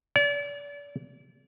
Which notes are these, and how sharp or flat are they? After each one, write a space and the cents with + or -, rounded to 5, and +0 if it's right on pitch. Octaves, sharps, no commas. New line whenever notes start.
D5 -35